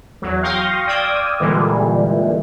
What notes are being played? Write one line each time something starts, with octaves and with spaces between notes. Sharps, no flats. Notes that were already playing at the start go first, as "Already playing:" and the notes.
E2 F#3
F5 G5 C6 C#6 D#6 A#6
D5 F5 G5 D#6 E6 G#6
A#2 D3 E3 G3 G#3